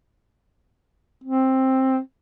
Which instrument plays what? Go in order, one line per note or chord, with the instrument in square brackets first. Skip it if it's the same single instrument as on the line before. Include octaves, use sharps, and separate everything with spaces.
[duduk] C4